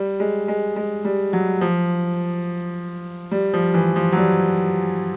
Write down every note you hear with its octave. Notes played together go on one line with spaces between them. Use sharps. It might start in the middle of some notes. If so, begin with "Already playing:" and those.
Already playing: G3
G#3
G#3
G#3
G3
F#3
F3
G3
F3
E3
F3
F#3
G3